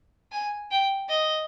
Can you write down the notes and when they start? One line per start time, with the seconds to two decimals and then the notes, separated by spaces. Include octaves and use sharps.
0.32 G#5
0.71 G5
1.09 D#5